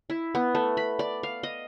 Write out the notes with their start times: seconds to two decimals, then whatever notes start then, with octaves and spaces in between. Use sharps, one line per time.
0.10 E4
0.35 B3
0.55 A3
0.77 B5
0.99 D5
1.23 F5
1.43 D#5